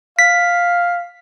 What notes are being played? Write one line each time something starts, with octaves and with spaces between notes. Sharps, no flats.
F5 B6